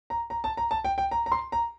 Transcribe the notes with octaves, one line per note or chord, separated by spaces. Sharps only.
A#5
A#5
A5
A#5
A5
G5
G5
A#5
A#5
C6
A#5